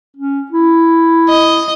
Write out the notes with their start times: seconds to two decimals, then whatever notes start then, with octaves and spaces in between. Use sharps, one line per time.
0.17 C#4
0.51 E4
1.29 D#5